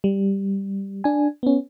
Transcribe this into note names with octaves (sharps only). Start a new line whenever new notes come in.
G3
D4 G#5
B3 C#4